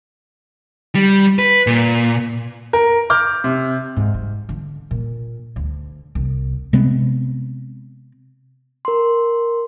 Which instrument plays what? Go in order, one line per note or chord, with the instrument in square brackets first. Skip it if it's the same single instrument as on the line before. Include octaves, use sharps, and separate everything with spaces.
[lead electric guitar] G3
B4
A#2
[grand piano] A#4
D6 F6 G6
C3
[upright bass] G#2
G#3
D3
A#2
D2
C2
[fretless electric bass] C3 G#3 B3 C4
[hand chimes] A#4 C6